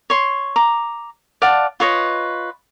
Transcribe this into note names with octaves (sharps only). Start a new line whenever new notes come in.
C#5 C6
A#5 D6
D5 F5 F#5 A5
F4 B4 C#5 D#5